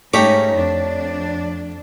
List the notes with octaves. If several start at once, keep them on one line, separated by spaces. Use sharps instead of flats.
G#2 A3 C#4 D#4 G4 C#5 D6
F2 D4